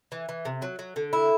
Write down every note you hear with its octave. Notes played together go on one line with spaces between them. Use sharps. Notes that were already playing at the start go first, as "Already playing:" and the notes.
E3
E3
C3
F#3
F#3
D3
E4